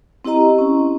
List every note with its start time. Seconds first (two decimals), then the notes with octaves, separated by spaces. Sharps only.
0.25 C4 E4 G4 D#5 A#5
0.58 C#4